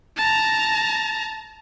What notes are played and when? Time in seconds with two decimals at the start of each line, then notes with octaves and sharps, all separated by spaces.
0.17 A5 A#5